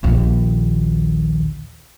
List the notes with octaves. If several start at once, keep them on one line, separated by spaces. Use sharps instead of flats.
A#1 D#2